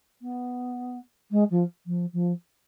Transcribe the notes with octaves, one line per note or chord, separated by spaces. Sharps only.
B3
G#3
F3
F3
F3